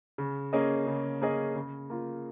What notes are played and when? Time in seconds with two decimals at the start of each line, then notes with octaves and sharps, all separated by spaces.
0.18 C#3
0.53 A#3 C#4 G#4 D#5
0.87 C#3
1.21 A#3 C#4 G#4 D#5
1.55 C#3
1.90 A#3 F4